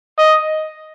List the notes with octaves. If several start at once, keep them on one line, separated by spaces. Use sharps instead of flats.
D#5